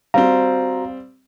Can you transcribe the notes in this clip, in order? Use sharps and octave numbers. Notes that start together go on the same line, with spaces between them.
G3 C4 F#4 C5 F5 A#5